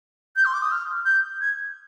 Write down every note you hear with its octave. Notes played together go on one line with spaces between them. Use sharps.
G6
C6
D6
D#6
F6
G6
G#6